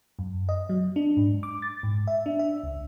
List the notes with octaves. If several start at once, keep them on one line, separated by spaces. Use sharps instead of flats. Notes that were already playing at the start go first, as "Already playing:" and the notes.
F#2
D#5
F#3
D4
G#2
D6
A6
G#2
E5
D4
E5
C#2